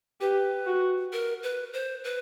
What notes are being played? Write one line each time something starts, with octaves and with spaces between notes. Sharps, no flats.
G4 B4
F#4
A#4
B4
C5
B4